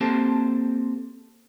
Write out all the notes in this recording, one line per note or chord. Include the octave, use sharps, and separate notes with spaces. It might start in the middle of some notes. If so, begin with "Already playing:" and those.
A#3 C4 G4 A4 C5 A5